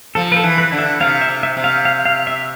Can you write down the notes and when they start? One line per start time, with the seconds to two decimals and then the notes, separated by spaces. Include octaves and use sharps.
0.15 F3 A4
0.32 B4
0.37 A4
0.43 E3
0.58 B4
0.72 D3
0.79 E5
1.00 C3 F5
1.21 E5
1.28 C3
1.43 E5
1.57 C3
1.64 F5
1.85 F5
2.05 F5
2.27 E5